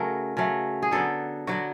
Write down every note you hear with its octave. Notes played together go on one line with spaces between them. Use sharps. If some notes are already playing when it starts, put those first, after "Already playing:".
Already playing: C#3 F#3 A3 A#4
C#3 F#3 A3
G#4
D3 F#3 B3 A4
D3 F#3 B3 F#4